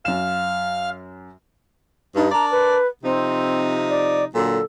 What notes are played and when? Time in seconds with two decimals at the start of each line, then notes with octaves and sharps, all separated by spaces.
0.05 F#2 F5 F6 E7
2.15 G2 D#4
2.31 D4 A#4 D5 A#5
2.51 B4
3.03 C3 F3 C4 D#4
3.89 D5
4.35 A#2 D3 F#3 A4